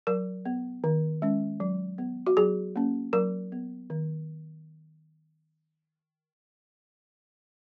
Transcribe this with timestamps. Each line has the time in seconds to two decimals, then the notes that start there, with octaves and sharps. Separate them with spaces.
0.07 F#3 A#4
0.45 B3
0.84 D#3
1.22 G#3 C#4
1.60 F#3
1.98 B3
2.27 F#4
2.37 F#3 G#4
2.76 A#3 C#4
3.13 F#3 A#4
3.52 B3
3.90 D#3